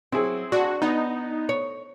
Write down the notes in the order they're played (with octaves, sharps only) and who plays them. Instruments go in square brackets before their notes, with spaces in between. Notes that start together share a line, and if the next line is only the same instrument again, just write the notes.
[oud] F#3 [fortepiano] C4 E4 G#4
[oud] D4 [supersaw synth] F#4
[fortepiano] B3 [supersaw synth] D#4
[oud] C#5